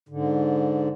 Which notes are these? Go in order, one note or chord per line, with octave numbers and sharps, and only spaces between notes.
G#2 D3